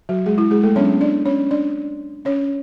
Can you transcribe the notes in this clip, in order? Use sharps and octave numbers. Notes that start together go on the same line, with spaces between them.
F#3 F#4
G#3 G#4
E4
G#3 G#4
A3 A4
F#3 B3 C#4 D4 C#5
D4 D5
C#4 C#5
D4 D5
C#4 C#5